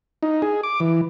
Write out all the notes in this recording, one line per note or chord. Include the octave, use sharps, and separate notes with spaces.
D#4
G#4
D6
E3